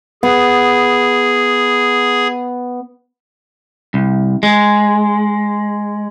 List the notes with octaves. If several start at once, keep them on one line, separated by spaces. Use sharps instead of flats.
B3 G#4
C2
G#3